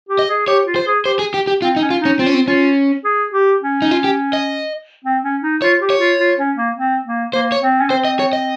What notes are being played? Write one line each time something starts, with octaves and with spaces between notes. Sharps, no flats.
G4
D#5
G#4
G4 C#5
F4
C5
G#4
G4 C5
G#4
G4
G4
C4 F4
D#4
C#4
F4
D#4
C#4
C4 F4
C#4
C4
C#4 F4
G#4
G4
C#4
D#4
F4
G4
D#5
C4
C#4
D#4
F4 C#5
G4
C#5
F4
F4
C#4
A#3
C4
A#3
A#3 C5
C#5
C4
C#4
C4 C5
D#5
C#5
D#5